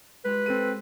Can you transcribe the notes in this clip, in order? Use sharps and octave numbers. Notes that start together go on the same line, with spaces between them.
G#3 G4 B4
C4 A4 D#7